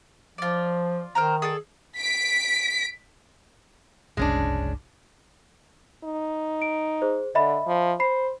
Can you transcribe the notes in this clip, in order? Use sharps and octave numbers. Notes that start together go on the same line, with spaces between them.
F3 F4 D5
D#3 A#4 C5 A#5
G#4 A4 D5
B6 D7
F#1 C2 G#3 C#4 D4
D#4
D7
G#4 C5
D3 D#5 E5 B5
F3
C5 B5 C7